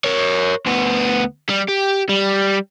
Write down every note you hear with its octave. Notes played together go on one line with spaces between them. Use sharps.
A#4 C#5
D2 B3
G3
G4
G3